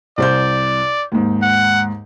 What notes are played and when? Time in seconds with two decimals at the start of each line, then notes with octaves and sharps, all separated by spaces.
0.18 C2 C5 D5 G6
1.12 D#2 G#2
1.42 F#5